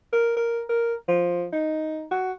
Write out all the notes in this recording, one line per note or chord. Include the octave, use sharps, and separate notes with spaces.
A#4
A#4
A#4
F3
D#4
F#4